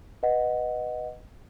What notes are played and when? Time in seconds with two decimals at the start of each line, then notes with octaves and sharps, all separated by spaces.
0.23 B4 D#5 F#5